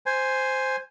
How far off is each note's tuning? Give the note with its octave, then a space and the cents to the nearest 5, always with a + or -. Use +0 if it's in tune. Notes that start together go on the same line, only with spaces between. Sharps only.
C5 +0 G#5 +0